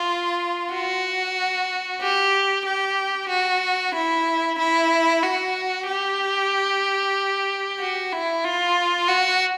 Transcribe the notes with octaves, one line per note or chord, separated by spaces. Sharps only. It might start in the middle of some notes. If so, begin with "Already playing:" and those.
Already playing: F4
F#4
G4
G4
F#4
E4
E4
F#4
G4
F#4
E4
F4
F#4